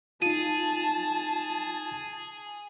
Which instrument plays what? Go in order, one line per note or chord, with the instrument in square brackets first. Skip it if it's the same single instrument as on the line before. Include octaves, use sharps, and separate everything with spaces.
[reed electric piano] D#4 F4 [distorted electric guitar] G#4 [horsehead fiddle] A5 [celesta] D#7